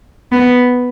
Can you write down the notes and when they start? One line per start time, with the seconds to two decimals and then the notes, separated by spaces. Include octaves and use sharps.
0.32 B3